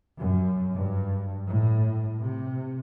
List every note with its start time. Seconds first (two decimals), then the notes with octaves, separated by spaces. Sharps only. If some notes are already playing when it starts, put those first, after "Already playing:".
0.18 F#2
0.75 G2
1.48 A2
2.21 C3